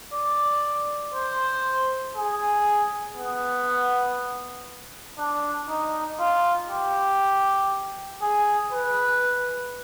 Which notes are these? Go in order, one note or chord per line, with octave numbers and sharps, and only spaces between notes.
D5
C5
G#4
B3
D4
D#4
F4
G4
G#4
B4